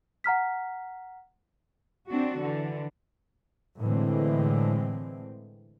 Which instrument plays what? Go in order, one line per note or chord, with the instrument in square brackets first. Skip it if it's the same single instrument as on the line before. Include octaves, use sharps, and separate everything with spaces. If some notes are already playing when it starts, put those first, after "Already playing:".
[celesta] F#5 A#5 F6 B6
[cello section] C4 D4 F#4
D3 E3
[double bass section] A2 D3 E3 G#3 C4